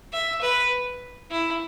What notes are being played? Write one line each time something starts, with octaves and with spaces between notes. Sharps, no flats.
E5
B4
E4